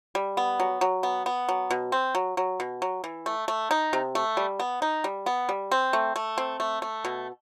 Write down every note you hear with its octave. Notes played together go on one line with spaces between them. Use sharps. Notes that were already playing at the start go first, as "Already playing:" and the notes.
G3
B3
F#3
F#3
B3
B3
F#3
B2
C4
F#3
F#3
B2
F#3
E3
A3
A3
D#4
C3
A3
G3
B3
D#4
G3
B3
G3
C4
A3
A3
C4
A3
A3
B2